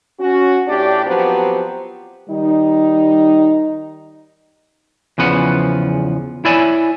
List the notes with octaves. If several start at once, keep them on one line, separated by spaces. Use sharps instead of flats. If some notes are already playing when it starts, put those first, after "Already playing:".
C#4 F#4
A2 D4 G4 D5
F3 F#3 B3 C4 G4
D#3 G3 D#4
E2 C#3 F3 B4 F#5
E4 C#5 D5 E5 G#5 B5